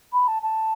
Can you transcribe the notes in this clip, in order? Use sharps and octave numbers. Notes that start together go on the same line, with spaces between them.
B5
A5
A5